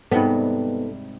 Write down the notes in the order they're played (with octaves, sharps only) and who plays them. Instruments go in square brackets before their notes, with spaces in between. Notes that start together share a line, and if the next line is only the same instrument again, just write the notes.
[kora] G#2 C3 G3 [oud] B3 [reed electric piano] D#4 A4